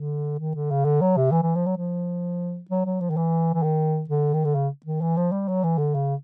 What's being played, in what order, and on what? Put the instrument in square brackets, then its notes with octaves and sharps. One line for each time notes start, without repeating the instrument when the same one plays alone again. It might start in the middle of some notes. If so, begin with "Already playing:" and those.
Already playing: [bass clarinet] D3
D#3
D3
C#3
D3
F#3
C3
E3
E3
F3
F#3
F3
F#3
F#3
F3
D#3
E3
E3
D#3
D3
D#3
D3
C#3
D#3
E3
F3
G3
F#3
E3
D3
C#3